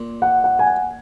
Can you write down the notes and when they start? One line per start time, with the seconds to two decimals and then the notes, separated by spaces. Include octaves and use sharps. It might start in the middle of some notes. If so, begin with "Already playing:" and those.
Already playing: A#2
0.22 F#5
0.44 F#5
0.59 G#5
0.66 F#5